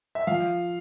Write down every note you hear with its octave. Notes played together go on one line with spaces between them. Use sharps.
E5
F3 F5